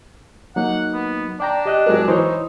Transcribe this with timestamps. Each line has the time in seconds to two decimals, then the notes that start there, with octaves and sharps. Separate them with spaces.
0.56 F#3 A#3 D#4 F#5
0.93 B3
1.40 D4 D5 G5 A#5
1.66 G4 D#5 F#6
1.86 F#3 G#3 A#4
2.08 E3 D#4 C5 C#5